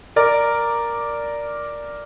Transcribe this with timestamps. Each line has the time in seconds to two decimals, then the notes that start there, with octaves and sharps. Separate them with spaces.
0.16 A#4 D5